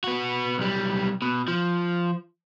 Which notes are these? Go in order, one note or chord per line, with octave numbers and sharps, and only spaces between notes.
B3 F#4
B1 G3
B2
F3